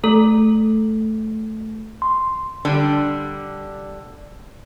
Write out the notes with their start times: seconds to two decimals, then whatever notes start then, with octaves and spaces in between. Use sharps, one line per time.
0.04 A3 A4
2.02 C6
2.65 D3 G3 D4